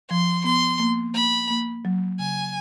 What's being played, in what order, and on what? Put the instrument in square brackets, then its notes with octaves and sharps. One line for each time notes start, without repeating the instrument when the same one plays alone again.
[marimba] F3 [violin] C6
[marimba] B3 [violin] C6
[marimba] A#3
[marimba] A#3 [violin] B5
[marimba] A#3
F#3
[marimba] C#3 [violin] G#5